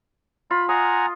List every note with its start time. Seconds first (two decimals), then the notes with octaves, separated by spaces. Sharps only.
0.51 F4 B5
0.69 D#5 F#5 G#5 A#5